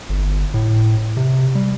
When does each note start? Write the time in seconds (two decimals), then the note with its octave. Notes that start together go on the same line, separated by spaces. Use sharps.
0.09 G1
0.54 A2
1.17 C3
1.55 G3